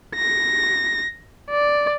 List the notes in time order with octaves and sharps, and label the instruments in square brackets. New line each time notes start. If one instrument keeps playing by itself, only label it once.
[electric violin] A#6
D5